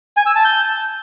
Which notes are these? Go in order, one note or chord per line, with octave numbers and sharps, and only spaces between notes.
G#5
E6
A5
G6